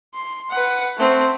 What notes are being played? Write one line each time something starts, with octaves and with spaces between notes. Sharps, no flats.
C6
B4 F#5
A3 C4